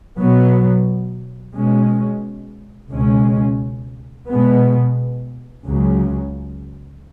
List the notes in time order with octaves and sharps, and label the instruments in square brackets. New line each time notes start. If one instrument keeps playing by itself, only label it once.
[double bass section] B2 F#3 B3
B2 G#3 C#4
C#2 B2 G#3 C#4
B2 G#3 B3
C#2 C#3 F#3